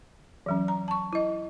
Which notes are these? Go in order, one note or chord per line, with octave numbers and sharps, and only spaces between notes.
E3 F#3 C#4
A#5
A5 C#6
E4 D#5